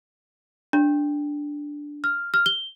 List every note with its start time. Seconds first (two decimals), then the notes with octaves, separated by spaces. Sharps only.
0.73 D4
2.04 F6
2.34 F6
2.46 G7